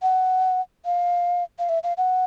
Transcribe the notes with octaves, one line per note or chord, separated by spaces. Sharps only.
F#5
F5
F5
E5
F5
F#5